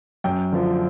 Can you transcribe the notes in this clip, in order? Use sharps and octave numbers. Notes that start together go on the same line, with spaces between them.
F#2 G5
D3 F3